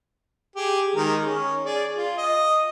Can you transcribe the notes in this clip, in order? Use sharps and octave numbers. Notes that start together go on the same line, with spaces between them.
G4 G#4
D#3 G#3 A#4
C#4
G#4 D5
F4
D#5